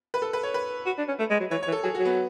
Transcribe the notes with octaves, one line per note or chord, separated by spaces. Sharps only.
B4
A4
B4
C#5
B4
F#4
D4
C#4
A3
G#3
F#3
E3 C#5
E3 C#5
A4
F#3 G#4
F#3 F#4
B3